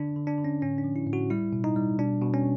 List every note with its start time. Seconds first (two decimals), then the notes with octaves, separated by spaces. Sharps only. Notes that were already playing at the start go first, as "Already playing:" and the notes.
Already playing: D3 D4
0.16 D3
0.27 D4
0.38 D3
0.45 C#4
0.62 A2 C#4
0.78 D4
0.84 F3
0.96 E4
1.07 A2
1.13 F#4
1.30 G3 E4
1.53 B2
1.64 D#4
1.76 G3
1.99 B2 D4
2.21 B2
2.34 C#4